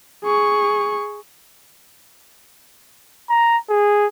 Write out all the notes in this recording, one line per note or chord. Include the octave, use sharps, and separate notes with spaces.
G#4 C#6
A#5
G#4